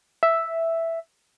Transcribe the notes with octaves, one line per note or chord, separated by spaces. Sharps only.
E5